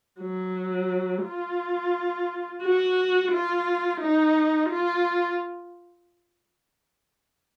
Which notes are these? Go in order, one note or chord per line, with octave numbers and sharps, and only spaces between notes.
F#3
F4
F#4
F4
D#4
F4